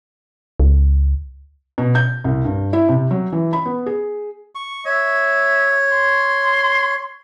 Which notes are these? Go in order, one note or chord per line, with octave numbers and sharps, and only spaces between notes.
C#2
B2
G6
C2
G2
E4
C3
F#3
E3
B5
B3
G#4
C#6
C#5 E5
C6